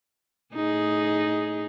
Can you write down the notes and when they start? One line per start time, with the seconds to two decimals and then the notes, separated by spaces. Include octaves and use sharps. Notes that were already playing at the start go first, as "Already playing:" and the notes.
0.55 A2 D#4 G#4